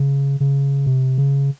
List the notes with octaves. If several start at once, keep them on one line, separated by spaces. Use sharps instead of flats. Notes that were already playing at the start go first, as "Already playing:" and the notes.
Already playing: C#3
C#3
C3
C#3